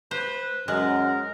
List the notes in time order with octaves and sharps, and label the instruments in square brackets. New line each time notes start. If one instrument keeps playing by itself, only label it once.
[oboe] B4 [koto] C5
[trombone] F#2 [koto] G#3 [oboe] A#4